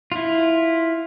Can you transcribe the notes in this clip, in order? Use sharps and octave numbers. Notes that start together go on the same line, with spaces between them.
E4 F4